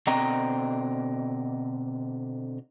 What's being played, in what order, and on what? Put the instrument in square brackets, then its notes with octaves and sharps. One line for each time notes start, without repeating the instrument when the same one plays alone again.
[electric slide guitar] B2 D3 C4 D#5 G5 A#5